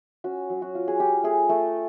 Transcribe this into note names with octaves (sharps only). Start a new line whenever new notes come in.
C#4 F#4
F#3
F#4
F4
G#4
F4 G4
A3 G#4
A3 A4